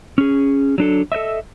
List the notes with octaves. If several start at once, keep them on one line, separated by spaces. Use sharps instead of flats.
C#4 G#4
F#3 D4 A4
A4 C5 D#5 E5